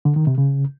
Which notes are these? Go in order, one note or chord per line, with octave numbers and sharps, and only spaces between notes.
D3
D#3
C3
C#3